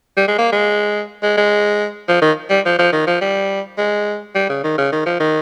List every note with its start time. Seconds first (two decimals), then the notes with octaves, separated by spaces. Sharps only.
0.17 G3
0.28 G#3
0.38 A#3
0.52 G#3
1.23 G#3
1.37 G#3
2.08 F3
2.22 D#3
2.50 G3
2.65 F3
2.79 F3
2.92 D#3
3.07 F3
3.21 G3
3.78 G#3
4.35 G3
4.50 C#3
4.64 D#3
4.78 C#3
4.92 D#3
5.06 F3
5.20 D#3